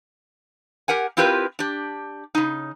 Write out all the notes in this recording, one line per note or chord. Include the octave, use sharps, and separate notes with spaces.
G4 A#4 F#5 G#5
C4 E4 F4 G4 A#4 B4
D4 G4
C#3 D#4